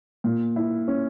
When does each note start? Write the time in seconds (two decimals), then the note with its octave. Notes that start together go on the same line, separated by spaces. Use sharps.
0.24 A#2
0.56 E4
0.88 C#4